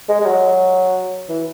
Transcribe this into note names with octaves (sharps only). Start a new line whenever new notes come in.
G#3
G#3
F#3
E3